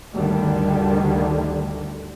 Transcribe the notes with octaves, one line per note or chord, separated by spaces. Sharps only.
D2 G2 D3 D#3 G3